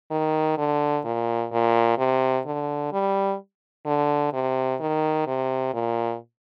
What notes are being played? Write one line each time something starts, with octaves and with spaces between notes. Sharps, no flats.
D#3
D3
A#2
A#2
C3
D3
G3
D3
C3
D#3
C3
A#2